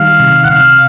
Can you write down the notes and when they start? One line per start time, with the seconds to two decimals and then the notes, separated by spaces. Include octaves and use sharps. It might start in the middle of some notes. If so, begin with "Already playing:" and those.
Already playing: D#3 G3 F5
0.20 C3
0.44 F#5
0.49 C3 F5